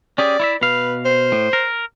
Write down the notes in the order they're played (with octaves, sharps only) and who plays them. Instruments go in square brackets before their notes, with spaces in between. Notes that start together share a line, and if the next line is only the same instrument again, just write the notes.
[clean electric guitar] C#4 G4 G#4 [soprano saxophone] D5
[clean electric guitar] E4 C#5 E5
[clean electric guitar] B2 F5 [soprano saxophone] B4
[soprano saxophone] C5
[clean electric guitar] A2
A#4